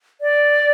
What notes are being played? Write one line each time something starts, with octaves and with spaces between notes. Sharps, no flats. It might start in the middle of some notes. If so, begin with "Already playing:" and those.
D5